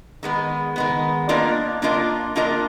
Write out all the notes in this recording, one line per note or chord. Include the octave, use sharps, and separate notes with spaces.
D#3 G#3 B3
D#3 G#3 B3
A#3 D4 F4 A#4 D#5
A#3 D4 F4 A#4 D#5
A#3 D4 F4 A#4 D#5